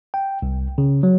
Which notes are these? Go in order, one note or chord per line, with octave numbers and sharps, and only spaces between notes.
G5
C2
C#3
F#3